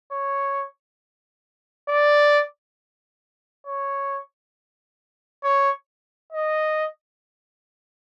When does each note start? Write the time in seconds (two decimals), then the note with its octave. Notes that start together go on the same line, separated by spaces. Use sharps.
0.12 C#5
1.89 D5
3.67 C#5
5.44 C#5
6.33 D#5